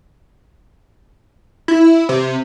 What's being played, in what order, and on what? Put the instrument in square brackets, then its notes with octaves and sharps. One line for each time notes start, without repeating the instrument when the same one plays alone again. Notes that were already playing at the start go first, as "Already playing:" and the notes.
[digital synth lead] E4
C3